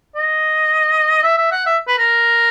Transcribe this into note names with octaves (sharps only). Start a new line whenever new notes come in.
D#5
E5
E5
F#5
E5
B4
A#4